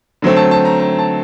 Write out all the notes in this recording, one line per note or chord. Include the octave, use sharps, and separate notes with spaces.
D3 F#3 A3 C4
A5
A5
A#5
A#5
A5